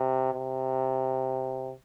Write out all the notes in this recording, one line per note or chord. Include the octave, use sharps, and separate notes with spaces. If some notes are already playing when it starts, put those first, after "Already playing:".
Already playing: C3
C3